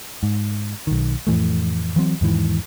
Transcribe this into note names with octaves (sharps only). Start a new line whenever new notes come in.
G#2
B1 D#3
F2 A2 E3 A3
E3 F#3 C4
E2 G#2 D#3 E3